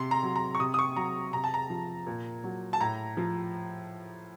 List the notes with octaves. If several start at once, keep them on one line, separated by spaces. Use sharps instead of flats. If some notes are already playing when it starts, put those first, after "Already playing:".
Already playing: C3 C6
A#5
F#3
A#5
C#6
C3 D#6
D#6
C#6
F#3 A#5
C3 A#5
A5
A#5
F3
A#2
F#3
A5
A2 A#5
F3